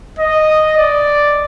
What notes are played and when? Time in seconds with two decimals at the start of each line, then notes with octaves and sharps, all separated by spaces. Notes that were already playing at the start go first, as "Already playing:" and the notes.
0.19 D#5
0.77 D5